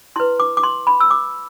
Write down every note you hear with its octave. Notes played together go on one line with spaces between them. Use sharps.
E4 B4 C6
D6
D6
C6
B5
E6
D6